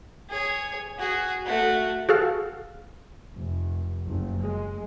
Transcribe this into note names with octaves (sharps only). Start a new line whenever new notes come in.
G#4 C#5
F#4 G#4
A3 F#4
F#4 G#4 A4 F5
F1
F#1
G#3